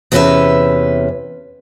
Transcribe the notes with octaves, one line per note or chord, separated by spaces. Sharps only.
E2 C3 C#4 F4 B4 E5